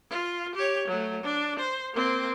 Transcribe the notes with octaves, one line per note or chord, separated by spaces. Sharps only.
F4
G4 C#5
F#3 A3
D4
C5
A#3 C4